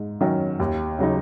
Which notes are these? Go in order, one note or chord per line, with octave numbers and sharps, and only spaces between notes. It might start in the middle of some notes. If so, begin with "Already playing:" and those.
Already playing: G#2
D#3 F#3 C#4
D#2
C#3 F#3 D#4